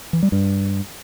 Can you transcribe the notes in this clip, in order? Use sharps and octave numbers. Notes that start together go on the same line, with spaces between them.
E3
G3
G2